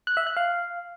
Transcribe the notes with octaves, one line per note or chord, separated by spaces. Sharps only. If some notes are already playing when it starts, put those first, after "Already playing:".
F#6
E5
F#6
F5